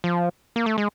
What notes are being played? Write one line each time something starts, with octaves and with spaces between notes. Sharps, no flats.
F3
A#3
A3
G#3